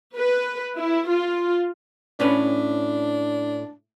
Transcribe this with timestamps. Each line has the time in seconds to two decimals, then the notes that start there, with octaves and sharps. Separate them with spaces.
0.15 B4
0.77 E4
1.09 F4
2.20 A2 C#4 D4 B4